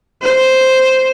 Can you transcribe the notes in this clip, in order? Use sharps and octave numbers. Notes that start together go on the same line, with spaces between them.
C5